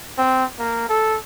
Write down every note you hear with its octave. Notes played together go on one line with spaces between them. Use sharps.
C4
A#3
A4